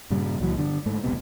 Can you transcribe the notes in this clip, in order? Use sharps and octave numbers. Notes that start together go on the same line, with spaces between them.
G2 A#2 C#3 G3
C#2 A#2 E3 F#3
G2 D3
G#2 A3
E1 B1 C3 B3